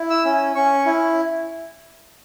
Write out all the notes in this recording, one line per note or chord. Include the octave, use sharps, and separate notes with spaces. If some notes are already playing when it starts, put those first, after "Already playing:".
Already playing: E4
E6
C#4
C#4 C#6
E4